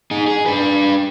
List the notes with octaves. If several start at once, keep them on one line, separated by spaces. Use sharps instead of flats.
D#4 G#4
G#4
D4 B4